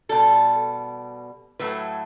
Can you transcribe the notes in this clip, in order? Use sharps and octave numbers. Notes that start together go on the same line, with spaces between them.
B2 G3 A4
A2 F#3 A3 B4